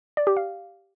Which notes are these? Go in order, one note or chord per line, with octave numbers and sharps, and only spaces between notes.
D5
G4
F5